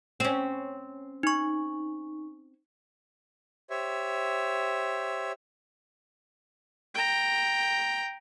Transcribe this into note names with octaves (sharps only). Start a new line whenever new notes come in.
C4 C#4
D#4 C#6
G4 C5 C#5 E5
G5 A#5